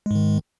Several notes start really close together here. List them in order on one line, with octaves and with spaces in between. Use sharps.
G#3 G#2 D#3